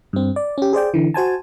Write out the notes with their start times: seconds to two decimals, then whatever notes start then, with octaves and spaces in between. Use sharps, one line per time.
0.13 G2 C4
0.36 D5
0.58 C#4 G4
0.73 G#4 C5 D5 G5
0.94 D3 E3
1.14 F#4 C5 G#5 A5